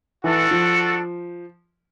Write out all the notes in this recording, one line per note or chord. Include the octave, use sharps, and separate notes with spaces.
E3 D4 F#4 A4
F3